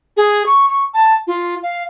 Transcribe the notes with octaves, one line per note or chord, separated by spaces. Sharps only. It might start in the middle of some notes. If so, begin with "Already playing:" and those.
G#4
C#6
C#6
A5
F4
F5